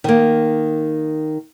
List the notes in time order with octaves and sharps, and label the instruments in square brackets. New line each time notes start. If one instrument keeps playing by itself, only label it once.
[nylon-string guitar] D#3 A#3